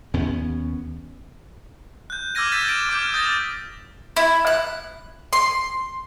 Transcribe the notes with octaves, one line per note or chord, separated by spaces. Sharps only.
D#2 B3 C#4
F#6 G6
D6 E6 F6 G#6 A#6 D#7
F6 G6 A6 B6 E7
D7 E7
D6 F6 G6
D#6 G6 A6 A#6
E4
F#6
C6